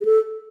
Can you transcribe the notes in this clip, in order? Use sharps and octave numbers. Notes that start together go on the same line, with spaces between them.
G#4
A4